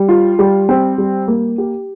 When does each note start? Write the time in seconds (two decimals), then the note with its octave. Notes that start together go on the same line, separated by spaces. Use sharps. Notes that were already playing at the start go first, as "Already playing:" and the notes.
Already playing: G3
0.09 F4
0.39 G3
0.69 C4
0.98 G3
1.28 A#3
1.58 G4